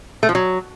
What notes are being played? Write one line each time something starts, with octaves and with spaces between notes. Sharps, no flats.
A3
F3
F#3